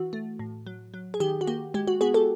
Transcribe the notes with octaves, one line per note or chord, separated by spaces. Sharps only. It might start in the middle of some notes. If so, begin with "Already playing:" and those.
Already playing: E3 F#4
A3
A2
F#3
F#3
G#4
D#3 G4
F#4
A#3 G4
G#3 G4
F#4
B3 F#4 G#4
G4 A4